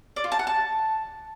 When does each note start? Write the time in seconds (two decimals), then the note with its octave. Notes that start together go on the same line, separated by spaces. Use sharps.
0.16 D5
0.24 F4
0.32 A5
0.39 F#5
0.47 A5